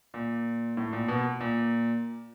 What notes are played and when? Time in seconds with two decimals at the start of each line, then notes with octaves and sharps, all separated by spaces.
0.14 A#2
0.77 A2
0.93 A#2
1.08 B2
1.40 A#2